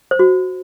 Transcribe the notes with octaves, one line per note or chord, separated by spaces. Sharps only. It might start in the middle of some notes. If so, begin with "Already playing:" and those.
C5
F#4